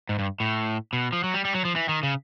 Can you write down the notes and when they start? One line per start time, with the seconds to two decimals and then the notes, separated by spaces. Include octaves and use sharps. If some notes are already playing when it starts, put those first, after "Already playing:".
0.09 G#2
0.19 G2
0.40 A2
0.93 B2
1.13 F3
1.24 F#3
1.34 G3
1.45 G3
1.55 F#3
1.65 F3
1.76 E3
1.89 D#3
2.03 C#3